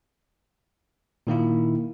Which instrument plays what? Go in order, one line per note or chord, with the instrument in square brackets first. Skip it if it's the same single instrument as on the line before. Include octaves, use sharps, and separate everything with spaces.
[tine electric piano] A#2 D#3 A#3 E4